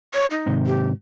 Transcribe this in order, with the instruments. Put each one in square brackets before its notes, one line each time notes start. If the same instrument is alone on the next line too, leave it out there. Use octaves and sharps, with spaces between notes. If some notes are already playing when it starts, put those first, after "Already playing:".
[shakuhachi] C#5
D#4
[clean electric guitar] G#2 C3 D#3
[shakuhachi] G4